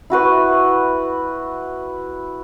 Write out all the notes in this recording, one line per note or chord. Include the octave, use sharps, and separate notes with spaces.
E4 F#4 B4 C#6